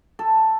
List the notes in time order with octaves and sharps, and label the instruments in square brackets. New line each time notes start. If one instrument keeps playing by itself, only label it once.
[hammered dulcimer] A4